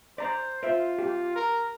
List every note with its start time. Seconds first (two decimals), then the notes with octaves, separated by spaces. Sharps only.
0.18 C5 D5 A#5
0.63 F4 C5 E5
0.99 G4
1.36 A#4